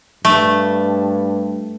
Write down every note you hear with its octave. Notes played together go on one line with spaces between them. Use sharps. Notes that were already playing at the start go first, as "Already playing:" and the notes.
G2 A3